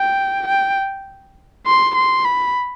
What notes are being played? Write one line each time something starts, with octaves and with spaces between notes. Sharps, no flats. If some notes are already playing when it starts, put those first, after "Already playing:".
Already playing: G5
G5
C6
C6
B5